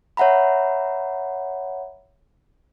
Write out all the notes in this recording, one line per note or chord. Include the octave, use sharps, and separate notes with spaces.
C#5 E5 F#5 A#5 B5